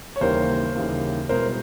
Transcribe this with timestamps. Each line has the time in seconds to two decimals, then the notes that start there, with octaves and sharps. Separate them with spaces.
0.16 C#5
0.21 D#2 C#3 E3 G3 A#3 A#4 C5
0.75 D#2 C#3 E3 G3 A#3
1.29 C2 B2 G#3 B3 A#4 C5